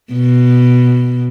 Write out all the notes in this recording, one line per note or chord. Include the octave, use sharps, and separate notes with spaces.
B2